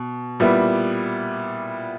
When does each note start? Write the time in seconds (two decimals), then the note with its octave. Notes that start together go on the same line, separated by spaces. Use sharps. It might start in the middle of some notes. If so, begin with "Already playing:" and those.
Already playing: B2
0.40 A#2 G3 B3 E4